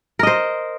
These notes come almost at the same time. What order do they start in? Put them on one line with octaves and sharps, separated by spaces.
A#4 D#5 C5